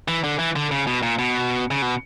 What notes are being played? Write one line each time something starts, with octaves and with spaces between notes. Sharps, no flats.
E3
D3
E3
D3
C#3
B2
A#2
B2
C#3
B2